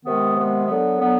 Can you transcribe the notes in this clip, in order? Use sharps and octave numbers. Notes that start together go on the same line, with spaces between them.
C3 D#3 G#3 B3
C3 D#3 G#3 B3
D3 F#3 B3
D3 F#3 B3